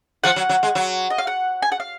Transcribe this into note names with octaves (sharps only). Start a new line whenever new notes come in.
F3 F#5
F#3
F#3
G#3
F#3
D#5
F5
F#5
G#5
F#5
F5